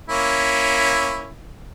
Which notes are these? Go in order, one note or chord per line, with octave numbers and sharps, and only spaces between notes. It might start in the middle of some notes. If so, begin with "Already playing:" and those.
A#3 C#4 E4